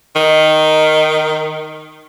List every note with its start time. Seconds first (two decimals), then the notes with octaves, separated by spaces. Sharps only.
0.16 D#3